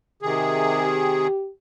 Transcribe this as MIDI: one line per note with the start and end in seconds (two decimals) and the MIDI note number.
0.22 1.27 48
0.22 1.27 51
0.22 1.27 68
0.80 1.50 67